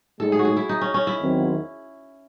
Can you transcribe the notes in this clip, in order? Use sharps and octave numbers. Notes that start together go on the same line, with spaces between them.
A2 G#3 D#4 A4
G#4
F#4
G#4
E4
D#4
C#4
C#4
E4
E2 D#3 F#3 C4